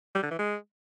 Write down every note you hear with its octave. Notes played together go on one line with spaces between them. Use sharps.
G3
D3
E3
G#3